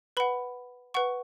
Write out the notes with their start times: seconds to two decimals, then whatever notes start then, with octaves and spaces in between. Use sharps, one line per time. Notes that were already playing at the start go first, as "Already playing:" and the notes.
0.17 B4 F#5 B5
0.94 B4 F#5 C#6